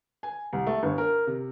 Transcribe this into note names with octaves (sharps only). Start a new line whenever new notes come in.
G#5
C2
A3
G1
A#4
C3